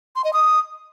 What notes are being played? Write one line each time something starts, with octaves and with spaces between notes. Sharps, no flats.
C6
D#5
D#6